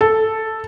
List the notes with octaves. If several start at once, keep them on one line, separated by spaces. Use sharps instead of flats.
A4